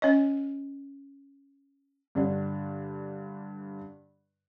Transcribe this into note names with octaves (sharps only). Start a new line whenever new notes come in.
C#4 C#5 D#5
G2 D3 D4